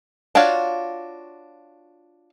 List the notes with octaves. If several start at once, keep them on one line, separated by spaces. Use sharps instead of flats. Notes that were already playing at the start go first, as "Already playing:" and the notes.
D4 F4 F#4 C#5 F5